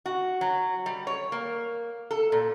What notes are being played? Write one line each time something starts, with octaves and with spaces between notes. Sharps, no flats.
F#4
F#3
G3
C#5
A#3
A4
A#2